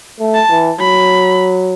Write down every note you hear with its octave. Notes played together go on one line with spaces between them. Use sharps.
A3
A5
E3
F#3 B5